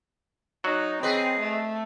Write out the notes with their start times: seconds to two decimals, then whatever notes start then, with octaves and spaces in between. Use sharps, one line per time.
0.64 F#3 D#4 F#4
1.03 C4 G#4 B4 D#5
1.40 A3